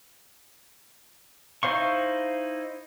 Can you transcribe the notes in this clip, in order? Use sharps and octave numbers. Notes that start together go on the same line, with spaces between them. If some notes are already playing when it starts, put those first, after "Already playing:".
D#4 E4 C5 F5 C#6